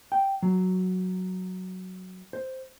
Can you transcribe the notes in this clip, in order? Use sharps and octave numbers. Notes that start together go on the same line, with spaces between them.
G5
F#3
C5